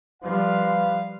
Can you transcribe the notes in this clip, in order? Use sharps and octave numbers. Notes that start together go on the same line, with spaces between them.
F3 G3 B4 F5